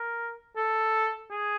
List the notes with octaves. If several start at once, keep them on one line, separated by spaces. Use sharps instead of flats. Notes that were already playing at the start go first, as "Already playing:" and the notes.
Already playing: A#4
A4
G#4